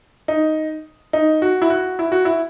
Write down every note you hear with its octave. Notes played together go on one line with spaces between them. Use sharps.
D#4
D#4
F#4
E4
F#4
E4
F#4
E4